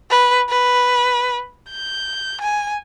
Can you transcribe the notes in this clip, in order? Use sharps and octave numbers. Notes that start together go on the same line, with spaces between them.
B4
B4
G6
G#5